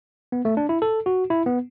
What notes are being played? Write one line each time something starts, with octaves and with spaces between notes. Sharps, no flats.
B3
A3
D4
E4
A4
F#4
E4
B3